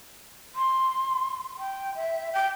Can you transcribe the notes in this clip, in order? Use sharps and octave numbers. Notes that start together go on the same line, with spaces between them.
C6
G5
E5
G5